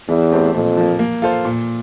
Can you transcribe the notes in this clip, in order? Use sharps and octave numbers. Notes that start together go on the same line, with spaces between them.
E2 E3
A3 C4 G4 C5
F2 A#2
F3 A#3
A#3
F4 A4 C5
A#2